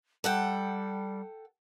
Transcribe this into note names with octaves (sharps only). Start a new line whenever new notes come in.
G3 A4 F#5 G5